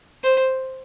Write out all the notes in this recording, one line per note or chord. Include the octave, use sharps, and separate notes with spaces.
C5